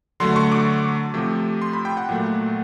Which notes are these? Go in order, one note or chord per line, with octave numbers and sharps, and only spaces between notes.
D3 F#3 A3 C6
C#6
D6
C3 F3 A3
C6
B5
G5
F#5
A#2 F#3 A3